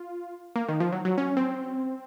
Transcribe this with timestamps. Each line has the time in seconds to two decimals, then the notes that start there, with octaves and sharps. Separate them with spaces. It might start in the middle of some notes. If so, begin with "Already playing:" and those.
Already playing: F4
0.56 A#3
0.69 D#3
0.80 F3
0.93 F#3
1.05 F#3
1.18 C#4
1.37 C4